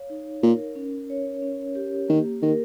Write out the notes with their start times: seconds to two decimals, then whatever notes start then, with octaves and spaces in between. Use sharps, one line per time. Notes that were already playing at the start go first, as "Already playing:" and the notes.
Already playing: C#5 F5
0.10 D#4
0.43 A#2 A#4
0.75 C#4
1.10 C#5
1.42 C#4
1.75 G4
2.08 D#3 A#3
2.42 D#3 A#4